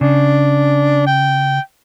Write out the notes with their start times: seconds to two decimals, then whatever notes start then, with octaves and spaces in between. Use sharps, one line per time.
0.01 C#3 D4
1.07 G5